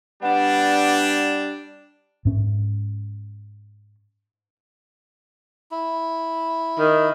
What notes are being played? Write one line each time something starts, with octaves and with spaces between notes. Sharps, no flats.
G3 B3 D4
G#2 C#4
E4
D#3